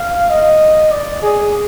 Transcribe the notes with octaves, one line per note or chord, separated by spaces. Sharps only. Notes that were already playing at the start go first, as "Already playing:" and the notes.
Already playing: F5
D#5
D5
G#4